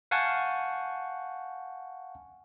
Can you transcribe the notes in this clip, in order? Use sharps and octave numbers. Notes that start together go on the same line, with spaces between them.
F5 F#5 G#5 A5 C#6 G6